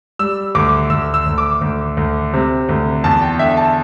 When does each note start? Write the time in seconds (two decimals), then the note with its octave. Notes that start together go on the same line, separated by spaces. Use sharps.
0.19 G3 E6
0.55 D2 D6
0.90 D2 E6
1.14 E6
1.26 D2
1.38 D6
1.61 D2
1.97 D2
2.33 C3
2.69 D2
3.04 E2 A5
3.22 G5
3.39 D3 E5
3.57 A5